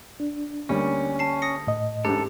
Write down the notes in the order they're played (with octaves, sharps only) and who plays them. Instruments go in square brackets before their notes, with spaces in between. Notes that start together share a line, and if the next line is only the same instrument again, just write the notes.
[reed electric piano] D4
[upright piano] D2 G3 A#3 [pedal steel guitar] C#4
[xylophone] A5 C7
D#6 A#6 C#7
[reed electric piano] A2 D#5
[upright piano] A1 G#2 [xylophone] G4 [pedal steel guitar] A4